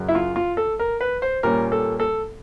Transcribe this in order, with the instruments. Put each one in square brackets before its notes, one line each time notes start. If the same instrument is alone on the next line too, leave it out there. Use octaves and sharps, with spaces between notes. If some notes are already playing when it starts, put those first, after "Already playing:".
Already playing: [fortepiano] F#2 C#3 F#3
E4
F4
F4
A4
A#4
B4
C5
A#2 G3 A#3 C#4 A#4
A4
A4